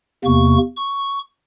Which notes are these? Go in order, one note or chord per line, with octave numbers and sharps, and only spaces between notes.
E2 C3 A#3 C#6
C#6